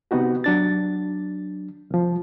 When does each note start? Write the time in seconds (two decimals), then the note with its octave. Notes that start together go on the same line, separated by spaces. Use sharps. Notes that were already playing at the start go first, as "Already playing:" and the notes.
0.11 C3 B3 D#4 F#4 G4
0.44 F#3 D4 A6
1.91 C2 F3